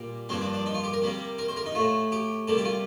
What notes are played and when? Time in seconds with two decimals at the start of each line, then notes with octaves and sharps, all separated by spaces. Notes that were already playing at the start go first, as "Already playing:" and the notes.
Already playing: A#2 G3 A#3
0.29 G2 F3 A#3 C4
0.41 D4
0.54 D4
0.66 D#4
0.74 F4
0.83 G4
0.93 A#4
1.02 C3 G3 A#3
1.38 A#4
1.48 C5
1.57 A#4
1.66 D#4
1.75 A2 A3 F4
2.12 G4
2.47 C3 G3 A#3 A4
2.57 G4
2.65 F4